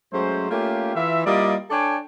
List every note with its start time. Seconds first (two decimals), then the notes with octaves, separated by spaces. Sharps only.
0.13 F#3 G#3 A3 C#4 C5
0.51 A3 A#3 C#4 F4 G4
0.95 E3 F4 E5
1.25 G3 A#3 E4 F4 D5 D#5
1.70 D4 A4 C#5 D5 G5 G#5